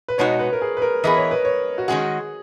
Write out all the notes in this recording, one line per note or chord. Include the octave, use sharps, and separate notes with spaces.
B4
B2 G#3 D#4 F#4 C#5
B4
A#4
G#4
B4
A#4
E3 B3 E4 G#4 D#5
C#5
B4
C#5
F#4
D#3 G#3 C#4 F#4 G#4